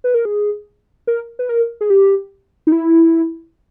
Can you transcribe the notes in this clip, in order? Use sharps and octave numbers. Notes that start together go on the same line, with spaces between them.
B4
A#4
G#4
A#4
B4
A#4
G#4
G4
D#4
E4